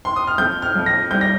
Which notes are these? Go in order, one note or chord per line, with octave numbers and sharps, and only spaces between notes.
C6
D#6
F6
F2 G6
F6
F2
A#6
G3 G6
A#6